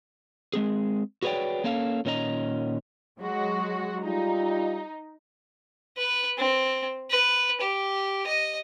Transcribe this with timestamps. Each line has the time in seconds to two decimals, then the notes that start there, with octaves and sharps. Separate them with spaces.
0.54 G#3 C4 G#4
1.23 F#4 G#4 B4 C#5 D5 G5
1.64 A#3 C#4 A4 F5
2.05 A#2 D#3 C#4 D#4 D#5 A#5
3.20 F#3 G#3 F#4
4.05 G3 D#4 F4
5.97 B4
6.38 C4
7.10 B4
7.61 G4
8.27 D#5